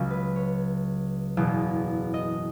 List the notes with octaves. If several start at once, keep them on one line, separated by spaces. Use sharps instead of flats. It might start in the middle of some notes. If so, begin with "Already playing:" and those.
Already playing: C#2 C#3 F#3 C#4
B4
C#5
F#1 E2 B2
D#5